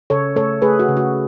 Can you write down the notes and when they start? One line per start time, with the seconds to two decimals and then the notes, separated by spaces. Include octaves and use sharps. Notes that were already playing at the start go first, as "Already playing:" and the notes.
0.10 C#3 A4 C#5
0.36 A3 A4 C#5
0.62 A3 G#4 B4
0.79 F#4
0.88 C#3
0.97 F#4